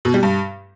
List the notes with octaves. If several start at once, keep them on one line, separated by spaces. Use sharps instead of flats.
B2
G3
G2